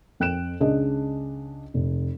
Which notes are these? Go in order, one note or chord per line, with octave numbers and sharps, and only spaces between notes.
F2 G5 F#6 D7 E7
C#2 C#4 D4 G#4 D#5
F1